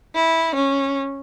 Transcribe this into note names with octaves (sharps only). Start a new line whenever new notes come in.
E4
C#4